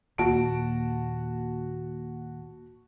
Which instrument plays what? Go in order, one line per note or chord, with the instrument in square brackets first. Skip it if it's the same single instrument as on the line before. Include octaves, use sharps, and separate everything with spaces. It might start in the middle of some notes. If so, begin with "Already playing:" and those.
[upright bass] D#2 A#2 [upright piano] F#4 A5 D7